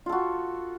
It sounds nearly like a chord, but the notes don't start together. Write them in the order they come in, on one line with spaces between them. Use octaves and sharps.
F4 A4 F#4